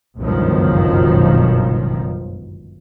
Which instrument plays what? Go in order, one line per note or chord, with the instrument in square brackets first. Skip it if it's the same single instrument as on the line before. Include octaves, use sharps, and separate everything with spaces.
[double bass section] G1 C#2 F#2 B2 D#3 F3